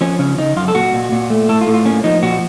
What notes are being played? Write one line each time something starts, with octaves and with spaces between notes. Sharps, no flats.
F3 C#4
C#3 C#4
C#3 D#4
F#2 F4
A4
A#2 F#4
A#2
A#2
A3
A2 A4
F4
A2
F4
A#3 C#4
F3 D#4
A#2 F#4